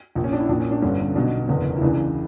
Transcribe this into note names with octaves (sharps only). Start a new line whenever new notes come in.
A#1 A#2
C#4
D4
E4
A#1 A#2 D4
C#4
D4
G1 G2 D3 C#4
B1 B2 D4
F#1 E2 D3
E4
C#2 C#3 E3 D4